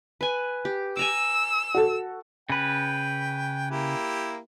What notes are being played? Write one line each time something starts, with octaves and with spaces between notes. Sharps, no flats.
B4 G#5
G4
G#5 A#5 D6 E6
F#4 A4
C#3 B4 G5
A#3 E4 G4